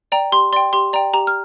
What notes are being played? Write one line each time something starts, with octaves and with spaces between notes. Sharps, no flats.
D5 G5 A#5
G4 C6
D5 G5 C6
G4 C6
D5 G5 A#5
G4 A#5
F6